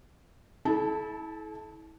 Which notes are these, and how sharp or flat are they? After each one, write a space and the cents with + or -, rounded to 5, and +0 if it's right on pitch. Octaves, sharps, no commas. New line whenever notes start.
E4 -30 A4 -40 A5 +0